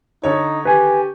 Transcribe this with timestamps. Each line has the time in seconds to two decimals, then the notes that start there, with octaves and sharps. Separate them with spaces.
0.23 D3 D#4 C#5
0.65 G4 B4 G#5